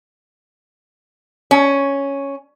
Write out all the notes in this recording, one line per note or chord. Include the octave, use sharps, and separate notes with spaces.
C#4